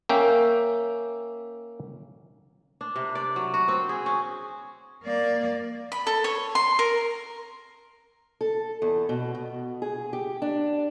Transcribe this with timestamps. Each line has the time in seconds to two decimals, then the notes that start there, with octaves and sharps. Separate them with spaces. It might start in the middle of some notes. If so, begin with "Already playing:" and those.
0.09 A#3 C#4 E5 G5
2.81 D4
2.96 C3
3.15 D5
3.36 F#3
3.54 F#4
3.68 C4
3.89 G#4
4.06 C#4
5.03 A#3 D5
5.92 B5
6.07 A4
6.24 C#5
6.55 C6
6.79 A#4
8.41 A4
8.82 E2
9.09 B2
9.35 B2
9.82 G#4
10.13 G4
10.42 D4